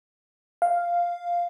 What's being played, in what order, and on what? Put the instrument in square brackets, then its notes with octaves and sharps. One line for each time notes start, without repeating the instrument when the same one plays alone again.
[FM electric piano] F5